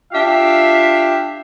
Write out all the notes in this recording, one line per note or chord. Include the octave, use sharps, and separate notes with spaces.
D4 F4 G4 E5 F5 G5